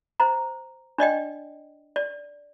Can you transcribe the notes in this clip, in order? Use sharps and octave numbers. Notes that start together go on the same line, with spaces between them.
C5 A#5
D4 D5 D#5 G5
D5